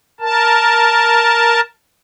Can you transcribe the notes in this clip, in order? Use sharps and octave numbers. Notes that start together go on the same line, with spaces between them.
A#4 A5